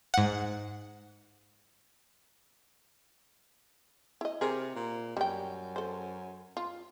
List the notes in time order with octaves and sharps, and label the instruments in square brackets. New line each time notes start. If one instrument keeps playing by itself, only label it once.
[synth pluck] G#2 F#5
[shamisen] E4 D#5
[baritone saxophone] C3 [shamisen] G#4 A#4
[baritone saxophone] A#2
[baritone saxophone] F#2 [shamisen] G3 G5
[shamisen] A4 C5
F4